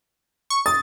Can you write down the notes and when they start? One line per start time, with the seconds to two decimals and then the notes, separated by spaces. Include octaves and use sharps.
0.50 C#6
0.66 D#6 A6